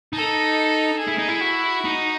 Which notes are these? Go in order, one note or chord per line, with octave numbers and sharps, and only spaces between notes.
D#4 A4
G#4
E4
D#4
E4
F#4
D#4